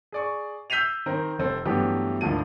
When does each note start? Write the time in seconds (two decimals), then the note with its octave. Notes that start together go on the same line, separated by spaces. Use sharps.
0.12 G#4 D5 C#6
0.70 E6 G6 B6 C7 D#7 F7
1.06 D#3 C4 A#4
1.39 F1 C4 A4
1.65 G2 E3 F#3 A3 B3 G4
2.21 G#1 D2 D3 F3 A5 D#7